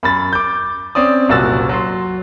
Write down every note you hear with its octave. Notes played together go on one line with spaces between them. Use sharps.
F#2 B5 A6
D6 G6
C4 C#4 D5 D#6
F#1 C2 A#2 F#4 E6 A6
F#3 C6